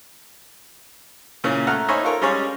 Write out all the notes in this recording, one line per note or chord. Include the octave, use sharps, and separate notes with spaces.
A#2 C#3 E3 C#4
A3 A4 F#5 A#5 F6
D#4 C5 C#5 E5 G#5 B5
F4 A4 A#4 C#5
G3 G#3 C#4 G#4 C#5 F5